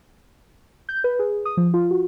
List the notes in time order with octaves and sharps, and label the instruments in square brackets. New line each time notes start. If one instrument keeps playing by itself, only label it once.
[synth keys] G6
B4
G#4
D#6
F3
F4
F#4